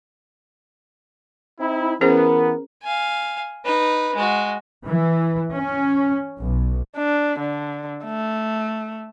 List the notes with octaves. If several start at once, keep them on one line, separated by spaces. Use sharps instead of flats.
C4 D#4 E4
E3 B3 C#4 G#4 A#4 C5
F5 G#5
D#4 B4
G#3 F#4
E3
C#4
B1
D4
D3
A3